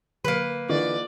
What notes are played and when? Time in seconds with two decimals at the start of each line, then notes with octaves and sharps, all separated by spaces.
0.25 D3 A#3 B4
0.69 D3 E3 D#4 F4 D5